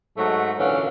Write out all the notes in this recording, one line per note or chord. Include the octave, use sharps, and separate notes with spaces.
G#2 F#3 A3
F#2 A#2 D3 E3 C#4 F5